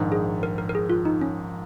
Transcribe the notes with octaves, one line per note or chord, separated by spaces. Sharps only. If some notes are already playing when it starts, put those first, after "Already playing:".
Already playing: A#1 G#2 D#3
G#4
A#4
A#4
A#4
G#4
F4
D#4
C#4